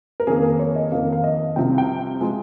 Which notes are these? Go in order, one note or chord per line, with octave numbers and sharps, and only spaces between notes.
A#4
F2 D#3 A#3 G#4
A#4
C#5
D#5
F2 D#3 A#3 F5
F5
D#5
C2 C3 F3 G5
G5
F3 G#3